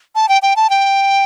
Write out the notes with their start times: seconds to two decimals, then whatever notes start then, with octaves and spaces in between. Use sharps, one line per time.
0.15 A5
0.29 G5
0.42 G5
0.56 A5
0.70 G5